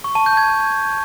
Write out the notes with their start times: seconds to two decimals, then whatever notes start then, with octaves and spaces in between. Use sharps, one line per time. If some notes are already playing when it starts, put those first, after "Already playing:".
0.04 C#6
0.15 A5
0.26 G6
0.37 G#6